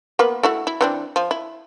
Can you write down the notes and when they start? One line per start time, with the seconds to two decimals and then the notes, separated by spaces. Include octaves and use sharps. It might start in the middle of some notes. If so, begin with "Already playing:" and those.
0.19 A#3 B3 B4
0.43 A3 E4 F#4
0.67 E4
0.81 E3 C4 D4
1.16 F3
1.31 E4